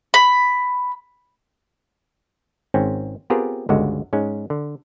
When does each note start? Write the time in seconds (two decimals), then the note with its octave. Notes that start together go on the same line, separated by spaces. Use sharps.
0.14 B5
2.74 G#1 G#2 C4 C#4
3.30 B3 C4 F4 G4 G#4 A#4
3.69 G1 C#2 D3 G#3 F#4
4.13 G#2 G#3 C#4
4.50 D3